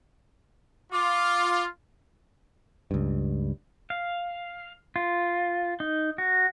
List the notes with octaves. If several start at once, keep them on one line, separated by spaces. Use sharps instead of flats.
F4 D6
C#2 G2
F5
F4
D#4
F#4